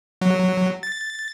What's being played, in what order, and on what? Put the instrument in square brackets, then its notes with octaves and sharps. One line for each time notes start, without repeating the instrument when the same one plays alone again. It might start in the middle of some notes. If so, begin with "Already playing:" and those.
[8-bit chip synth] F#3
A6